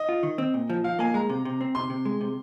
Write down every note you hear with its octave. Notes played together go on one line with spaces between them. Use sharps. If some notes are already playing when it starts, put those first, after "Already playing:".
Already playing: D#5
F4
D#3
C4
A#2
F3
F3 F5
A#3 G#5
G#3 A#5
C3
C3
C4
C3 C6
C3
G#3
C3